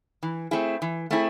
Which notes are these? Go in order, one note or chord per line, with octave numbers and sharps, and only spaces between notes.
E3
A3 C4 E4 G#4
E3
A3 C4 E4 G#4